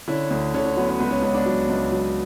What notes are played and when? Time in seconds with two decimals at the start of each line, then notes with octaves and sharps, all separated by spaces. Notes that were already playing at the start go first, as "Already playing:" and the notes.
0.08 D3 C#4 E4
0.30 D2
0.54 D3 C#4
0.66 C#4
0.77 F#3 B3
0.89 C#4
0.99 C#2 B3
1.11 C#4
1.22 C#2 C#4
1.34 B3 D4
1.46 F#3
1.69 C#2
1.92 F#3